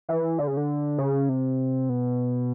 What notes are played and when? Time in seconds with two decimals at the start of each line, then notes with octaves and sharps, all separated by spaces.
0.09 E3
0.38 D3
0.47 C#3
0.57 D3
0.98 C#3
1.29 C3
1.89 B2